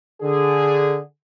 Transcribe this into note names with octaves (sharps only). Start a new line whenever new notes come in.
D3 G#4